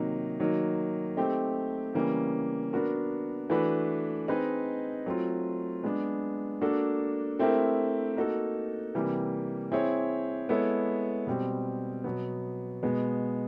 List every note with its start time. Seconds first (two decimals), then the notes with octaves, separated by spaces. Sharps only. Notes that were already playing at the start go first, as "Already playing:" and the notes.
Already playing: C3 D#3 F#3 A#3 D#4
0.40 D#3 F#3 A#3 D#4
1.17 A3 C4 D#4 G4
1.95 C#3 E3 G3 A#3 C#4
2.73 B3 D4 F#4 A#4
3.50 E3 A3 D4 F#4 B4
4.28 C4 D#4 G#4 B4 D#5
5.06 F#3 A3 C4 F4
5.83 G#3 B3 D4
6.61 A#3 D4 F#4 A4
7.39 A3 C4 E4 G4 A#4
8.16 A#3 D#4 F#4 A4
8.95 C3 E3 G3 A#3
9.72 C4 E4 G#4 C#5
10.49 G#3 B3 E4 A4 C#5
11.27 B2 G3 C4
12.04 B2 F#3 B3
12.83 B2 G#3 B3